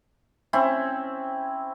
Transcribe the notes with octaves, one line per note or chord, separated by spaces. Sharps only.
C4 C#4 E4